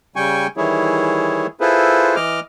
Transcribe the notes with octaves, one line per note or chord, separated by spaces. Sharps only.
C#3 G3 G5 G#5 C#6
D#3 E3 G3 E4 G#4 C#5
E4 F4 G#4 A4 B4 C5
E3 D#5 D6 F6